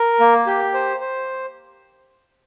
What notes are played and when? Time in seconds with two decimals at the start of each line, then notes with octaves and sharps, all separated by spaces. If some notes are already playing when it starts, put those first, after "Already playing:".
Already playing: A#4
0.20 A#3
0.47 G4
0.74 C5
1.00 C5